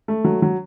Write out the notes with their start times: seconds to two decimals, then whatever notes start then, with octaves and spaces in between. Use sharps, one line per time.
0.08 A3
0.25 F#3
0.42 F#3